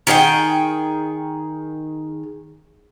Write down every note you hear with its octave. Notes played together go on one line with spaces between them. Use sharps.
D#3 G#4 D#5 G5